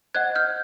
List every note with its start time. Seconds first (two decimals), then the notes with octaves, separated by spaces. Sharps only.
0.14 C5 D#5 F#5 F#6 G#6
0.35 F6 G6